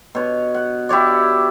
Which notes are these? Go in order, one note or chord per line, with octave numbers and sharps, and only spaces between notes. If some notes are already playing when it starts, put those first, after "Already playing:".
B2 C#5
F#5
E4 G4 C#5 D5